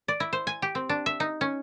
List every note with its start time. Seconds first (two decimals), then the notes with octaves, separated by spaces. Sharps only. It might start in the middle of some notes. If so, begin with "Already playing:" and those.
0.08 D5
0.20 E4
0.33 C5
0.47 G#5
0.62 G4
0.75 C4
0.89 D4
1.06 E5
1.20 D#4
1.41 C#4